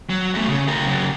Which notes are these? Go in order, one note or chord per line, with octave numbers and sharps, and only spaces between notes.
F#3
E2 A3
C#3
G4 A#4
C#3 F#3